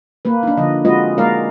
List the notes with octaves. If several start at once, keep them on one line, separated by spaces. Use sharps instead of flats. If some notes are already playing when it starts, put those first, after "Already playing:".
A#3 B4
D4 D#4
D3 F3 D#5
G#3 C4 F4 F#4 B4 D#5
G#3 A#3 D#4 A#4 D5 F5